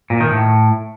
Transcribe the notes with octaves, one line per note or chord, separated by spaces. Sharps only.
A#2
D#3
A2